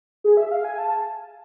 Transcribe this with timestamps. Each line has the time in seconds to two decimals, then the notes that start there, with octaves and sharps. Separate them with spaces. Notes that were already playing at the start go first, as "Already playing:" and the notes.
0.24 G#4
0.37 E5
0.52 F5
0.64 G#5
0.78 A5